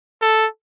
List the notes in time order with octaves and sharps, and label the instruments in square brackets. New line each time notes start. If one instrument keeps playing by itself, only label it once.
[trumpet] A4